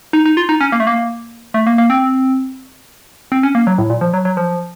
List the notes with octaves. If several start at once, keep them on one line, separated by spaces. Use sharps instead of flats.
D#4
D#4
F4
D#4
C#4
A#3
A3
A#3
A3
A#3
A#3
C4
C4
C#4
A#3
F#3
A2
A#2
F3
F#3
F#3
F3